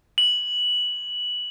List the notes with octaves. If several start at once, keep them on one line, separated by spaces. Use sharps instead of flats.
F#7